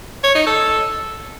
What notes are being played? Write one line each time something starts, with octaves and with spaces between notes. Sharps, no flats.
C#5
D#4
A4